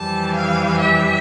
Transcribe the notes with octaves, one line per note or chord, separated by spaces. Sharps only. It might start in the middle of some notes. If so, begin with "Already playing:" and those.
Already playing: F2 E3 G3 A5
F5
E5